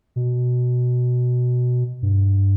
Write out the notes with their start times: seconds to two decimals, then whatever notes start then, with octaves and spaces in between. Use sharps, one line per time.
0.16 B2
2.02 G2